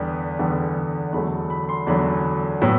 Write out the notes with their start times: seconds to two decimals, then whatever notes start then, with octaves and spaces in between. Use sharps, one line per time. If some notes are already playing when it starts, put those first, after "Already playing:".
Already playing: E2 D3 G3 B3
0.39 E2 D3 G3 B3
1.13 E2 D3 F#3 A3 B5
1.50 B5
1.69 C6
1.87 E2 D3 F#3 A3 B5
2.62 A2 F#3 B3